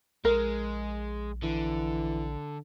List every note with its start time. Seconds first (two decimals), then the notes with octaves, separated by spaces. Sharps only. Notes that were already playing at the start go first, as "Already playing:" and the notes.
0.25 A#1 G#3 A#4
1.43 D3 E3